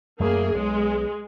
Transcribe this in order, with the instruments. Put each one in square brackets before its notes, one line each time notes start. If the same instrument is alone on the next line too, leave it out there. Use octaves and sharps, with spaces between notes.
[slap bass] F#2 A3 [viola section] A#3 G#4
[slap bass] B1 [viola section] G#3